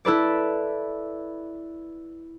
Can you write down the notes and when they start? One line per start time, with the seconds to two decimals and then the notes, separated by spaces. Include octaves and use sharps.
0.05 E4 A4 B4 D5